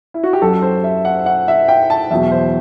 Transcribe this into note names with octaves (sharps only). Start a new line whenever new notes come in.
E4
F#4
G4
F#2 F#3 A4
C5
E5
F#5
F#5
E5
G5
A5
E2 B2 F#3 E5
C5